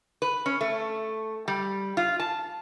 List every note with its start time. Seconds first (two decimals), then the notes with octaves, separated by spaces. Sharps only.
0.22 B4
0.46 C#4
0.61 A3
1.48 G3
1.97 F4
2.20 A5